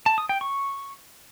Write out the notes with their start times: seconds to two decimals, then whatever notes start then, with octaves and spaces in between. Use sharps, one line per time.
0.06 A5
0.18 D#6
0.29 G5
0.41 C#6